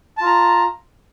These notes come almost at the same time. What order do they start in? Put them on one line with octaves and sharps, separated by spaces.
A5 F4 A#5